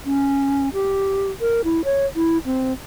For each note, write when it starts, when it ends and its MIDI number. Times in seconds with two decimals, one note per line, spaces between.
0.06 0.69 61
0.74 1.30 67
1.41 1.62 70
1.65 1.85 64
1.85 2.06 73
2.16 2.38 64
2.46 2.73 60